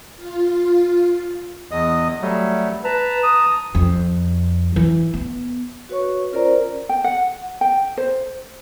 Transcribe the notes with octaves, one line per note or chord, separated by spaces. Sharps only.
F4
E2 D#5 D#6
F#3 G3 A3
B4 A5 A#5
D#6
F2
E3
B3
F#4 B4 C#5 C#6
C#4 F4 A#4 C5 D5 A#5
G5
F#5
G5
C5